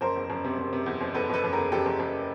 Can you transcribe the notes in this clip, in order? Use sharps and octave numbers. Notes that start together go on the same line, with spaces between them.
F#1 A#4 C5
E2
F#1
C3
C3
C3
E2
F#1
E2 A4 B4
F#1 A4 B4
F#1
E2 G#4 A#4
F#1 G4 A4
F#1
F#1